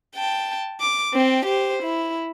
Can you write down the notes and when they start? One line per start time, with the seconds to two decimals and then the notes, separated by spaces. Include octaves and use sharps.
0.15 G5 A5
0.81 D6
1.14 C4 G5
1.46 G4 C5
1.83 E4